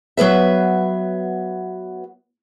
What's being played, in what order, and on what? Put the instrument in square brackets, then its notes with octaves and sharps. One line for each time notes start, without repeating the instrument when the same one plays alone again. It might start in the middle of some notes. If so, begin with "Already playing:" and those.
[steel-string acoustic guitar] F#3 B3 B4 E5